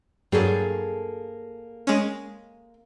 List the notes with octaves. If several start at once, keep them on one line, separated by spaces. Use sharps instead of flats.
G2 F#3 A#3 G#4 A4
G#3 C#4